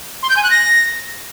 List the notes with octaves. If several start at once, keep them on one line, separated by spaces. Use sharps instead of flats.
C6
G6
G#5
F#6
A#6